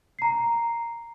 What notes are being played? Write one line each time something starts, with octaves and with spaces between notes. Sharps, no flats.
A#5 C7